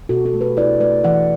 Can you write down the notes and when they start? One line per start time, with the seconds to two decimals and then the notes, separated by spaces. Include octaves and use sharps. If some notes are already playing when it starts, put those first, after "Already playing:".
0.09 B2 F#4 A4
0.25 F#4 A4
0.34 A3
0.41 G4 B4
0.57 E4 B4 D5
0.80 A3 B4 D5
1.04 E3 D5 F#5